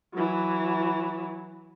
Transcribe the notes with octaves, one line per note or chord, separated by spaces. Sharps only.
E3 F#3